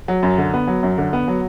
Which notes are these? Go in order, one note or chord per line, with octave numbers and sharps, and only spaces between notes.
F#3
F#2
D3
B3
F#3
F#2
D3
B3
F#3